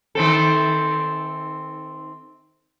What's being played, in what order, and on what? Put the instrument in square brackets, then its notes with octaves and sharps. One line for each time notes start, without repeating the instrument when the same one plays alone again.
[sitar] D#3 C4 A4